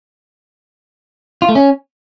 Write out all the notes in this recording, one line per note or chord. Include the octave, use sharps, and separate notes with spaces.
F4
A3
C#4